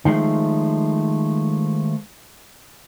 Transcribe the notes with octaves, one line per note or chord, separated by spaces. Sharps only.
D#3 F3 G#3 A3